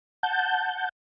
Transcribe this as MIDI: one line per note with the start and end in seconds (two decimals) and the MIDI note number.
0.23 0.89 78
0.23 0.89 81
0.23 0.89 91